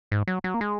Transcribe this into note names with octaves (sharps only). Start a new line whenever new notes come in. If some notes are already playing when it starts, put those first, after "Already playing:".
G#2
F#3
F#3
A#3
G#3